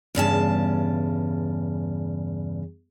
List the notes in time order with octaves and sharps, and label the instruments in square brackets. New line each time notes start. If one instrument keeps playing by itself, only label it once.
[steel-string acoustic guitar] E2 G2 C#3 A5